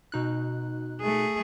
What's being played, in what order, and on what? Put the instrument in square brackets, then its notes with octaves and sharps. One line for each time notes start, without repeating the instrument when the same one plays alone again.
[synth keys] B2 D#4 F#6
[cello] A3 G#4